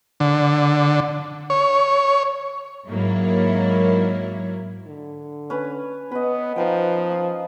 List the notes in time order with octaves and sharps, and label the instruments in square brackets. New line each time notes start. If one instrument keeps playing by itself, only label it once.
[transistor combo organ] D3
C#5
[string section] G#2 F#3 A#3 E4 C#5
[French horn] D3
[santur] C#4 B4
[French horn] B3 [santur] B4 D#5
[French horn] F3 [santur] D#4 B4 G5
[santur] D#6